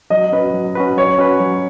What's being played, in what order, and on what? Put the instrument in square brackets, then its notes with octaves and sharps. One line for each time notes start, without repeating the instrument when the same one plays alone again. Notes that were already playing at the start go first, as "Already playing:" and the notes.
[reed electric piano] F#3 [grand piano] D#5
[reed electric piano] C#4 F#4 B4
F#3
C#4 F#4 B4
[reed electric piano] F#3 [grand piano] C#5
[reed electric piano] C#4 F#4 B4
F#3